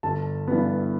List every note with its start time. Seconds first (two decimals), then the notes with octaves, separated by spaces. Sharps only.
0.03 G1 A5
0.48 G2 E3 B3